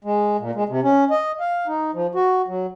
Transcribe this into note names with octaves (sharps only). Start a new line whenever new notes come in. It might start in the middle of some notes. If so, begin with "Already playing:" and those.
G#3
A#2
G#3
C3
C#4
D#5
F5
D#4
F3
F#4
F#3